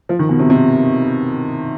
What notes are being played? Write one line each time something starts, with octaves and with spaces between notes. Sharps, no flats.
F3
D#3
B2
C3
C3